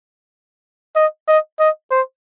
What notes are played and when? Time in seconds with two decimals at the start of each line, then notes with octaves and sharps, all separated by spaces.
0.96 D#5
1.28 D#5
1.60 D#5
1.91 C5